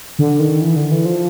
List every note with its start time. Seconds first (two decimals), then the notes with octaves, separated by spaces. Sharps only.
0.19 D3
0.40 D#3
0.62 E3
0.76 D3
0.92 E3
1.05 F3